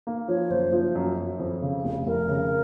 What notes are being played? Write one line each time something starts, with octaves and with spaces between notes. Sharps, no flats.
A#3
F3 C#5
F#1 C5
F3
F#2
F#2
F2
C#3
F1
F1 A#4
C#3